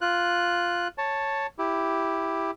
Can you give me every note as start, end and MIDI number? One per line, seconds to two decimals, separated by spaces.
0.01 0.88 65
0.01 0.88 90
0.98 1.47 73
0.98 1.47 81
1.59 2.51 64
1.59 2.51 67